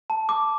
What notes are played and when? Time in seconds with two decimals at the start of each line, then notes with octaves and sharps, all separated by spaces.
0.10 A5
0.29 D6